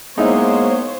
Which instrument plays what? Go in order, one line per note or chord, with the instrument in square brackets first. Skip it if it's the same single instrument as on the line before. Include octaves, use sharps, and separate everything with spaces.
[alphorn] G#3 [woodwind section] A#3 B3 [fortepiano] D#4 E4 [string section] C5 C#5